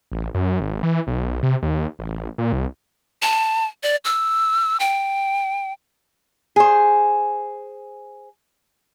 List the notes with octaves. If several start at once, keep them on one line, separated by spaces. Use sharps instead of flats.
A1
F#2
G#1
E3
B1
C3
D#2
A1
A#2
C2
A5
D5
E6
G5
G#4 C5